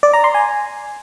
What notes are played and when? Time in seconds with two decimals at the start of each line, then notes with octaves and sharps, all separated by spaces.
0.03 D5
0.13 A#5
0.24 C6
0.34 G#5